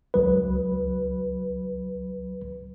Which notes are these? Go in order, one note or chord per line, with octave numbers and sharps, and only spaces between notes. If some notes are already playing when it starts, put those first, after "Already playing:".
C#2 F#3 B4